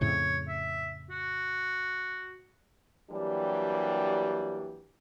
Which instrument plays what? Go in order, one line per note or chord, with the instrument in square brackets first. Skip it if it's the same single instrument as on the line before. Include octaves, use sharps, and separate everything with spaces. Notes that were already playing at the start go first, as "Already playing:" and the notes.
[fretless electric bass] F2 A2 C#3 [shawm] C#5
[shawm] E5
F#4
[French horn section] E3 F#3 G3 A#3 D4 G4